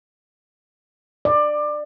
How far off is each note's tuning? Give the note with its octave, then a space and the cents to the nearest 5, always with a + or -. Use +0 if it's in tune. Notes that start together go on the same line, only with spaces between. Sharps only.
D5 +20